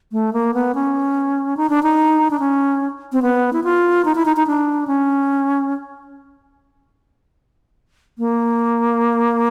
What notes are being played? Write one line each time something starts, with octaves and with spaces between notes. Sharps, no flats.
A3
A#3
B3
C#4
D#4
D4
D#4
D4
C#4
C4
B3
E4
F4
D#4
E4
D#4
D#4
D4
C#4
A#3